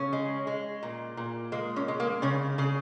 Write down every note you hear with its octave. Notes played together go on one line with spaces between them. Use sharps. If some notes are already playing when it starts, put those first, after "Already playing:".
Already playing: C#3 C#4
G#3
G#3
A#2
A#2
G#3 A#3
C#4
G#3
A#3
C#3 C#4
C#3 G#4